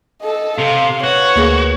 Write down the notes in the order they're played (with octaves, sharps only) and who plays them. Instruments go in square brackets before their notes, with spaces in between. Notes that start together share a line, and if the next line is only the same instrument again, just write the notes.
[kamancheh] A4 D#5
[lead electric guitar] C3 [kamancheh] F5
[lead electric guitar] F#4 [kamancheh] B4 C#5
[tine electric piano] D2 A#3 G#4